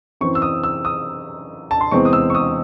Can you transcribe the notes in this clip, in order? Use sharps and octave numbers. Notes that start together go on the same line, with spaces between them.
F#2 E3 C4 C#6
E6
D#6
E6
D#6
A5
C6
E2 C3 E3 G#3 C4 C#6
D#6
E6
C#6
D#6